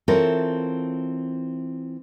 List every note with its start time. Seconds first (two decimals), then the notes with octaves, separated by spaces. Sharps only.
0.08 E3 C4 F4 A4 A#4 C#5